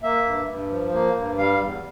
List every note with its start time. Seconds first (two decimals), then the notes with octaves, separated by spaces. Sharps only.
0.03 A#3 E5
0.25 G2
0.48 G2
0.70 F3
0.93 A#3
1.16 G2
1.38 G3 F5
1.60 E2